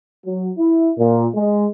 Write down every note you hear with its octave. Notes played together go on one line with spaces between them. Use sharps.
F#3
E4
A#2
G#3